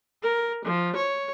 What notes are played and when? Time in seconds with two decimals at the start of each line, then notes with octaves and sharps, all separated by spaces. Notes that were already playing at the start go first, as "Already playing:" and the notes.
0.22 A#4
0.64 F3
0.96 C#5